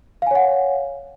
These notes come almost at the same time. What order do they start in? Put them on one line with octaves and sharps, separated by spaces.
F5 G#5 C#5 F#5